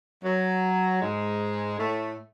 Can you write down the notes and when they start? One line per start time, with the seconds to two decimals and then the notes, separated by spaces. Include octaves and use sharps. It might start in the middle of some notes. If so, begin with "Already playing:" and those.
0.24 F#3
1.02 G#2 G#3
1.79 A2 A3